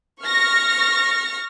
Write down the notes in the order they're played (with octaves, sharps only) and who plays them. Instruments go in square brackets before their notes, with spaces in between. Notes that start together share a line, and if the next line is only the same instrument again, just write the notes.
[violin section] C#6 F6 A#6